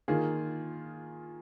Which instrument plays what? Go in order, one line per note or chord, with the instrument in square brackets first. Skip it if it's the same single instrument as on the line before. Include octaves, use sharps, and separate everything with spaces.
[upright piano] D#3 A#3 F4 G#4